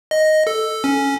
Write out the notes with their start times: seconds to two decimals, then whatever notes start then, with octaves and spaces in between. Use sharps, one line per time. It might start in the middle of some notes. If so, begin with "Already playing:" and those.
0.11 D#5
0.47 A4
0.84 C#4